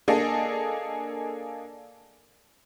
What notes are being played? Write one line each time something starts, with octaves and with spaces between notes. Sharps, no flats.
A#3 D4 G#4 A4 D#5